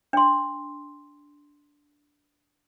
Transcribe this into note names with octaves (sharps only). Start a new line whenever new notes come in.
D4 C6